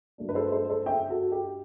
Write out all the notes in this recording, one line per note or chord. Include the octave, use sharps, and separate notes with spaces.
G2 F#3 A3 D4
B4
A4 C5
A4 C5
A4 C5
E5 G5
F#4 A4
G4